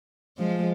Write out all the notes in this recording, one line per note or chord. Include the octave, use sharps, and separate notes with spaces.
F3 G#3